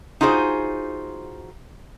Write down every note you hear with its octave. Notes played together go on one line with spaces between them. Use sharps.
D#4 F4 F#4 G#4 C5